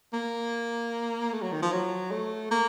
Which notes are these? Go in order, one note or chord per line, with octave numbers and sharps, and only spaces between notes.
A#3
A3
F#3
D#3
F3
F#3
A3
A#3